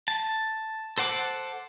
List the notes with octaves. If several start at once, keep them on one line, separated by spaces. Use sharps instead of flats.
A5
A4 C5 F#5 D6